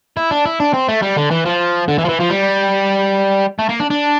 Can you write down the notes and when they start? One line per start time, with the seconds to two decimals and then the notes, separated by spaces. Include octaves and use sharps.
0.17 E4
0.31 D4
0.45 E4
0.60 D4
0.74 C4
0.89 A3
1.02 G3
1.17 D3
1.31 E3
1.46 F3
1.88 D3
1.98 E3
2.05 F3
2.09 E3
2.20 F3
2.30 G3
3.59 A3
3.69 A#3
3.80 D4
3.90 D4